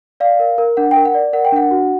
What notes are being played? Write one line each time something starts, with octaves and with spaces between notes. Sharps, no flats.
D5 F5
A#4
A#4
D4 F#5
G5
A#4
F#5
D5
A#4 F#5
G5
D4 F#5
F#4